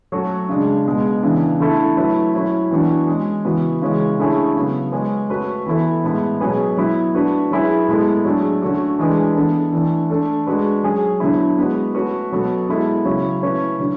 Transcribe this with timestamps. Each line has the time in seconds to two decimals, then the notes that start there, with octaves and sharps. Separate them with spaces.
0.12 F#3 A3 C#4 F#4 A4
0.49 C#3 G#3 D4
0.86 B2 G#3 B3
1.23 C#3 E3 B3 D4
1.60 D3 A3 E4 A4
1.97 F#3 A3 E4 B4
2.34 F#3 C#4 E4
2.71 E3 B3 D4 F#4
3.07 G#3 C#4 G#4
3.44 C#3 E3 B3 F#4 B4
3.82 C#3 E3 G#3 C#4
4.18 D3 A3 C#4 E4 G#4
4.56 C#3 F#3 B3
4.92 G#3 C#4 G#4 B4
5.29 A3 C#4 F#4 B4
5.66 E3 B3 E4 A4
6.03 A2 G#3 B3 E4 B4
6.41 B2 F#3 C#4 G#4 B4
6.77 F#3 B3 E4
7.14 A3 D4 F#4 B4
7.51 F#3 C#4 E4 G#4 B4
7.88 A2 G#3 B3 E4 A4
8.25 F#3 A3 D4 G#4
8.62 D3 A3 C#4 F#4
8.99 E3 G#3 D4 G#4 B4
9.36 E3 B3 D4 A4
9.73 E3 A3 D4
10.10 A3 D4 A4
10.47 G#3 D4 F#4 B4
10.84 F#3 C#4 G#4
11.20 D3 F#3 B3 E4
11.57 G#3 B3 F#4 B4
11.95 A3 C#4 F#4 B4
12.31 B2 F#3 B3 F#4 A4
12.68 G#3 B3 E4 A4
13.05 C#3 F#3 C#4 E4
13.42 A3 C#4 E4 B4
13.79 D3 F#3